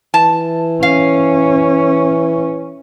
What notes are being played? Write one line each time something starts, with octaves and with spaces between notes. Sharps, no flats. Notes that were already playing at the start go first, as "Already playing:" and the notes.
E3 A5
C#4 F5